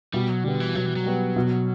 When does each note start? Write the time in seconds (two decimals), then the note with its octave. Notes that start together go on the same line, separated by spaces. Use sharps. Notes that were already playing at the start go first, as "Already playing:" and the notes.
0.13 B2 G3
0.29 F#3
0.44 D3 G3 B3
0.60 E3
0.75 B2 F#3
0.86 E3
0.96 F#3
1.06 G3 B3
1.36 B2